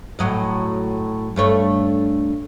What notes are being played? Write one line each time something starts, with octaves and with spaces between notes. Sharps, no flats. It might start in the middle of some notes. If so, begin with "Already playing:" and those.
A2 F#3 D#5
G2 A3 C#5